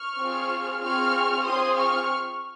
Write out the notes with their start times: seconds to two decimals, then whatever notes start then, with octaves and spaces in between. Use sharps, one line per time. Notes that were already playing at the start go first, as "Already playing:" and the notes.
Already playing: C#6 F6
0.17 C4 F4 G#4
0.81 C4 F4 G#4 C#6 F6
1.45 C4 F4 G#4 C6 D#6
1.76 C#6 F6